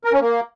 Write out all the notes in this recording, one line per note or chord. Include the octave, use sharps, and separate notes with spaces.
A#4
C#4
A#3